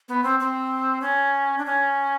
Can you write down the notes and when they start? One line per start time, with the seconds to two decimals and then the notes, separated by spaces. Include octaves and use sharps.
0.09 B3
0.24 C4
0.40 C4
1.02 C#4
1.58 D4
1.65 C#4